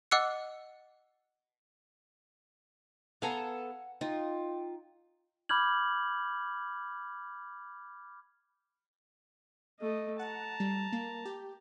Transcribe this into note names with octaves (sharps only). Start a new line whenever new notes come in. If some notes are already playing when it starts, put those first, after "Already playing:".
D#5 F#5 D6 E6 F#6 C#7
B3 A4 F5 F#5 G#5 A#5
D#4 F4 G5
B5 D6 F6 G6 G#6 F#7
A3 D#5
F#5 A5 A#5
G3
A#3
G4